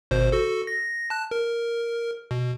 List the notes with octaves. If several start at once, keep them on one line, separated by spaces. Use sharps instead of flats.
G#1 B2 C5
F#4 A4
A#6
A5 F#6
A#4
B2